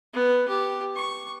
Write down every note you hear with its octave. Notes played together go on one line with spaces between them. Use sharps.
B3
G4
C#6